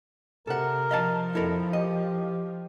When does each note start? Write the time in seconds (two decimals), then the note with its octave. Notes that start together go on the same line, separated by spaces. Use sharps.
0.47 C3 A4 A#4 F#5
0.91 F3 D#5 F5 A5
1.35 F2 E4 A4 A#4
1.73 G4 D#5